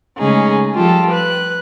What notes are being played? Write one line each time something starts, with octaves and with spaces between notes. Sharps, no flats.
C#3 G#3 A3 C#4 D#4 G#4
F3 G3 F4 G4 A4
B4 F#6